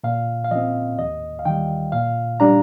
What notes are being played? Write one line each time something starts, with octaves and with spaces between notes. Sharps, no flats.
A#2 F5
F5
F3 C4 D#5
D#2 D#5
F5
D#3 G3 G5
A#2 F5
G3 D4 A#5